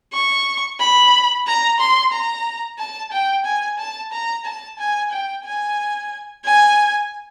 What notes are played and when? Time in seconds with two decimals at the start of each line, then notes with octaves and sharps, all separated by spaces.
0.13 C#6
0.80 B5
1.46 A#5
1.79 C6
2.12 A#5
2.78 A5
3.11 G5
3.45 G#5
3.78 A5
4.12 A#5
4.45 A5
4.79 G#5
5.11 G5
5.44 G#5
6.45 G#5